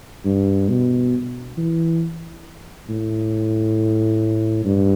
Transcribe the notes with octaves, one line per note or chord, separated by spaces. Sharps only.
G2
B2
E3
A2
G2